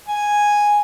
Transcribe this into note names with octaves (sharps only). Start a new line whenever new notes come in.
G#5